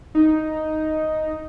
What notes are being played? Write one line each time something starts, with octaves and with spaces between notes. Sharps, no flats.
D#4